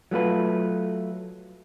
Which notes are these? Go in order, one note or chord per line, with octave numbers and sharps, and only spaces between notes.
F#3 A3 F4 B4